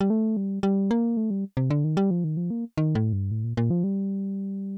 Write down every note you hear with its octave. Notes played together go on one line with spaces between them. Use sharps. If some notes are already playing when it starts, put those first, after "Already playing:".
G3
A3
G3
G3
A#3
A3
G3
C3
D3
D#3
G3
F3
D#3
F3
A#3
D#3
A2
G2
A2
A#2
A#2
F3
G3